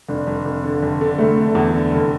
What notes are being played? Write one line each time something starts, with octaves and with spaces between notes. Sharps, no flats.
F1 D4
F1
F1
D3
F1
D3
F1 A3
D3
E2
D3
F1